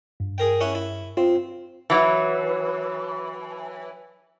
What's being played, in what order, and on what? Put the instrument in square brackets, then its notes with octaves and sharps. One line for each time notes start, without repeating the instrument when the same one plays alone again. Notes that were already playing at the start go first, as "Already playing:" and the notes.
[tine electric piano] G2
[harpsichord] G#4 A#4 G5
C#4 E4 F#5
E4
[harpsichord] C4 [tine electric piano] F4 C5
[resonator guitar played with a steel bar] E3 F#3